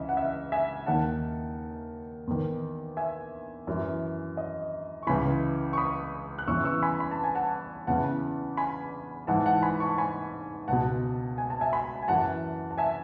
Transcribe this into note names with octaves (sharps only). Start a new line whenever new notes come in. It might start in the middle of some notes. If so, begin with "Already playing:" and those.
Already playing: C#2 C#3 E3 D#5 E5
F#5
E5
E5 G#5
D#2 D#3 F#5 A5
E2 D#3
E5 G#5
F#2 E3
D#5
C#6
C#2 C#3 E3 G#5 B5
C#6
B5 D#6
F#6
E2 C#3 E3 C#6 E6
C#6 E6
G#5 B5
B5
A5
G#5
F#5 A5
E2 C#3 E3 F#5 A5
G#5 B5
G#2 E3 F#5 A5
F#5 A5
G#5 B5
A5 C#6
G#5 B5
C#2 B2 F#5 A5
G#5
A5
E5 G#5
G#5 B5
G#5
F#2 E3 F#5 A5
A5
E5 G#5